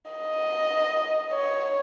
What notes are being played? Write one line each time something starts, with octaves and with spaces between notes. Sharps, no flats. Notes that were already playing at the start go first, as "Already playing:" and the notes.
D#5
C#5